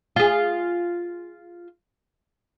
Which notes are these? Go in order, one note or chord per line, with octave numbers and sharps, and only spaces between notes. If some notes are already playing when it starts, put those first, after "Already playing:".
F4 G#4